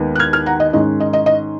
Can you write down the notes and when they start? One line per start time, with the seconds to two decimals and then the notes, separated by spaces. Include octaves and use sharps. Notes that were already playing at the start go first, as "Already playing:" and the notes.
Already playing: D#2 D#3 G#3 B3
0.15 F#6
0.19 F6 G#6
0.33 F6 G#6
0.46 F#5 A#5
0.60 D#5
0.73 G#2 D#3 G#3 C#4 D#5
1.00 D#5
1.13 D#5
1.26 D#5